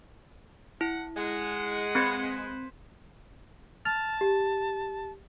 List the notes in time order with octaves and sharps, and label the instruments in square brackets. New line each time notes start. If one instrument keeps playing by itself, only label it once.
[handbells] E4 [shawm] F#5
[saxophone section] G#3 [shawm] F#5
[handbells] C4 G#6 C#7 [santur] B4 C5
[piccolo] A5 [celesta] F6 A6 F7
[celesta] G4